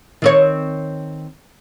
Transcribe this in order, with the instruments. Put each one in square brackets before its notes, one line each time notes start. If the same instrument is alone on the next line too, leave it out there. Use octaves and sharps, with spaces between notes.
[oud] D#3 C4 C#5